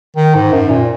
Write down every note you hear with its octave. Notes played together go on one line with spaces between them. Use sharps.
D#3
G#2
F#2
A#2